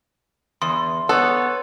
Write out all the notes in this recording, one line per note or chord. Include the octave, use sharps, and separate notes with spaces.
E2 C6
B3 A4 C#5